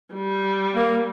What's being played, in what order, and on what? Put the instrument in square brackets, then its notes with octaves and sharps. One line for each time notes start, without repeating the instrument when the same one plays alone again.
[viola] G3
[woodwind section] A#3